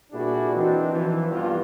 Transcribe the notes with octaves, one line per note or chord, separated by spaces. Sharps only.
A#2 G3 D4 E4 F#4 G#4
E3 C4 D4 D#4 F#4
E3 F3
C2 G2 E3 B3 F4